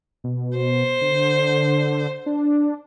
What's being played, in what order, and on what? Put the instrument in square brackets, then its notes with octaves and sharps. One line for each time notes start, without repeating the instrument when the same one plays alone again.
[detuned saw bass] B2
[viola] C5
[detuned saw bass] D3
D4